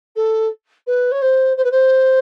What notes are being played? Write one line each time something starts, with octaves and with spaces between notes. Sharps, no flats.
A4
B4
C#5
C5
C5
B4
C5